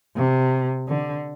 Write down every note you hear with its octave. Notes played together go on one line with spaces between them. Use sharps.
C3
D3